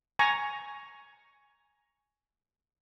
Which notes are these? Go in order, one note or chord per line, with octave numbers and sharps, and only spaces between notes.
G#5 A#5 C#6